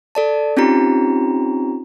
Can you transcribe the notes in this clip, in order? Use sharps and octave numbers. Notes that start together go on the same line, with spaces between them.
A4 D5 A5
C4 C#4 D#4 F4 G4 A#5